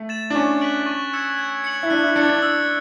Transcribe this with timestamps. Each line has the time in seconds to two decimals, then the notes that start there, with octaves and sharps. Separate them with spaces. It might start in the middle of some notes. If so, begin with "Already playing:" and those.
Already playing: A3
0.09 A6 E7
0.30 D4
0.35 C#4 C#6
0.61 F#6 B6 D7 F#7
0.86 C#6
1.13 E6 G#6 C#7 E7
1.39 G#6
1.64 C#7 F#7
1.83 E4
1.90 D4 F#6
2.04 E4
2.16 D4 A6 C#7
2.29 D4
2.42 E6